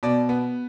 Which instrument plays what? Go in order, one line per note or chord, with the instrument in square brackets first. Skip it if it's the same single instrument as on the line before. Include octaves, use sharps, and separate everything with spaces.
[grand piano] B2 D5
B3